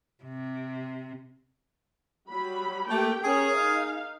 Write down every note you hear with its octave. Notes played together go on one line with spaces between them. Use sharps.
C3
F#3 G3 B5
A3 A#3 G4 G5
C#4 G#4 A#4 C#5
D#4 F5